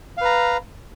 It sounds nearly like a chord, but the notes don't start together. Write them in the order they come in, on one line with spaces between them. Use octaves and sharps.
F5 B4 A#5